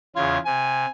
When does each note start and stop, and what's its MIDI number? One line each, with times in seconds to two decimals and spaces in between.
0.16 0.38 40
0.16 0.38 49
0.16 0.38 65
0.16 0.38 92
0.46 0.86 48
0.46 0.89 80